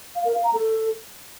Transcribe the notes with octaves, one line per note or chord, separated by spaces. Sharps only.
F5
A#4
F5
A#5
A4